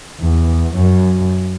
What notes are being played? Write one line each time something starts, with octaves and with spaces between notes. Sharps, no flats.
E2
F#2